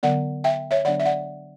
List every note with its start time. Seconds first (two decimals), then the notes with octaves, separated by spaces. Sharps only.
0.03 D3 F#3 B3 D5 F#5
0.44 E5 G5
0.71 C#5 E5
0.85 D3 F#3 B3 D4 D5 F#5
1.00 E5
1.05 D5 F#5